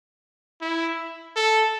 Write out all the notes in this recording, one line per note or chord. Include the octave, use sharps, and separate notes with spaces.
E4
A4